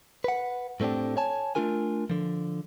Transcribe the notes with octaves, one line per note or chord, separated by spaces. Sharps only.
B4 F#5
A2 A3 C4 D4 G4
C#5 G#5 A5
A3 A#3 D4 F4 A#4 G#5
D3 F3